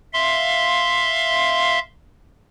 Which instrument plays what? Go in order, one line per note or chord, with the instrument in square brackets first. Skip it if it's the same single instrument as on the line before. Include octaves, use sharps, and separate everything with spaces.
[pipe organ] E5 F5 C6